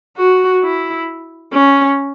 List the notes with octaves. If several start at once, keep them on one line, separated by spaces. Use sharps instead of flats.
F#4
E4
C#4